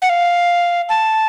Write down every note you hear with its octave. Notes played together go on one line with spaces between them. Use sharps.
F#5
F5
A5